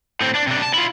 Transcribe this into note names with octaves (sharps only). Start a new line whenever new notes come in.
A2 C4
D4
C3 D4
A5
E4 F4